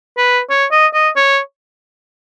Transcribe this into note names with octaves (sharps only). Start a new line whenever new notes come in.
B4
C#5
D#5
D#5
C#5